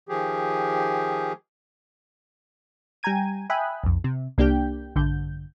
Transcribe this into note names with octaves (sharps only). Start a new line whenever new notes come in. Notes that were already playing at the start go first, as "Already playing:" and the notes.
D#3 F3 G4 G#4
G3 G5 G#5 A#5 G#6 D#7
E5 G5 G#5 B5 D#6 F#6
B1 F2
C3
C2 A#3 D4 G4 G5 G6
A#1 G2 D3 G6